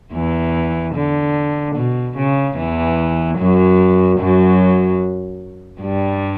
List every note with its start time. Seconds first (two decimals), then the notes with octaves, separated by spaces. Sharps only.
0.13 E2 E3
0.95 D3
1.76 B2
2.17 C#3
2.57 E2 E3
3.38 F#2 F#3
4.19 F#2 F#3
5.82 G2 G3